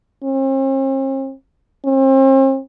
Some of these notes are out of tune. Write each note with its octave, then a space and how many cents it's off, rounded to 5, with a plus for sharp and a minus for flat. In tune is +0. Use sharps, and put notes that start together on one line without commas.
C4 +45
C4 +40